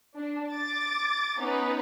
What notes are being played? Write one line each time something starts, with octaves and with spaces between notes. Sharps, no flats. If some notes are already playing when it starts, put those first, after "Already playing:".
D4
D6 A6
B3 C#4 D#4 B4